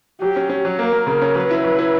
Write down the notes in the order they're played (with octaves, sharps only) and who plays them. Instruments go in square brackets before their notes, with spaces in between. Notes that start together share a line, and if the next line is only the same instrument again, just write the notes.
[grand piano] F#3 [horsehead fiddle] G4
[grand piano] C#4
C#4
F#3
[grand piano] A#3 [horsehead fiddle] A#4
[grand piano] A#3
C#3
C#4
[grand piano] F#3 [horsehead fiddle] B4
[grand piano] E4
F#3
E4